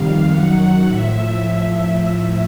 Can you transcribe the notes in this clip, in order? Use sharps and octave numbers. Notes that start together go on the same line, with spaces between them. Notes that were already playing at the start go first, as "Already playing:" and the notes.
Already playing: F2 C3 D#3 G3 F5
F#2 D#3 F#3 F#5
A2 F3 E5